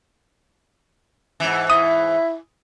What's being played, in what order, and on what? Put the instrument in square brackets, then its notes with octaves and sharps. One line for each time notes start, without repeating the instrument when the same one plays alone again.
[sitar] G#2 E3
[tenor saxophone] E4 [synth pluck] D#6